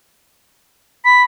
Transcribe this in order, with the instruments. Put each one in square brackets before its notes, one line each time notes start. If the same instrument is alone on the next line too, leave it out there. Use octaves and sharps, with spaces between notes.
[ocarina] B5 [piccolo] B6